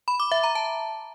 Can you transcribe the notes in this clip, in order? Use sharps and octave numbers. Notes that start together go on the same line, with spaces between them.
B5
D6
E5
A#5
A5